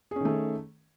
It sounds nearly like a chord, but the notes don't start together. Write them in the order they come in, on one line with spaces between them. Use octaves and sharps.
G#4 C#4 D#3 A3